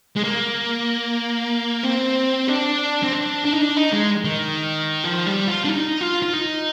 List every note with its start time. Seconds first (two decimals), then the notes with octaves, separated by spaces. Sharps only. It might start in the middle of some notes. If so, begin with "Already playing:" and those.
0.17 G#3
0.24 A#3
1.84 C4
2.48 D4
3.03 C4
3.13 D4
3.45 D4
3.53 D#4
3.61 D4
3.76 D#4
3.92 G#3
4.24 D#3
5.04 F3
5.26 G3
5.48 F4
5.64 D4
5.69 D#4
6.01 F4
6.22 F4
6.33 D#4